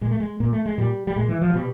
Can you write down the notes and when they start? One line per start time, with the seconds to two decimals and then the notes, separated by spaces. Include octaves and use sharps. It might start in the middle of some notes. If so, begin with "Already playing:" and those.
0.01 A#2 G#3
0.11 A3
0.20 G#3
0.40 A#2 A#3
0.53 A3
0.66 G#3
0.78 A#2 G3
1.07 G3
1.16 A#2 G#3
1.28 E3
1.41 F3
1.50 F#3
1.54 B2 G3